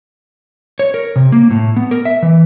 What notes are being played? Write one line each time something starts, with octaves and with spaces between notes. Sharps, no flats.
C#5
A#4
C3
A#3
A2
B3
A#4
E5
E3